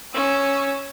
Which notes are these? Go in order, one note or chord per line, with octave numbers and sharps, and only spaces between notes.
C#4 E6